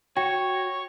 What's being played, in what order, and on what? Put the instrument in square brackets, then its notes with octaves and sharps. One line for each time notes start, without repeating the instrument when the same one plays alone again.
[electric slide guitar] F#4 [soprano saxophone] C#5 [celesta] G5